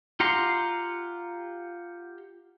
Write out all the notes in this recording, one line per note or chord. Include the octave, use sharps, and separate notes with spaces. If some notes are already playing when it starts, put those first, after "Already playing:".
F4 G4 F#5 A#5 C6